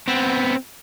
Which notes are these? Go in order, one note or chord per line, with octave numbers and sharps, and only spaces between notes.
B3 C4